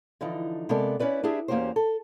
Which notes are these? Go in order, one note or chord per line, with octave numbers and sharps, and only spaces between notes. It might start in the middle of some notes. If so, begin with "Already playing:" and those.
D3 E3 F3 D#4
C3 G#3 B3 A4 A#4 D5
C#4 E4 B4 D5
D4 E4 G4 G#4 E5
E2 A#3 C#4 F#4 G4 C5
A4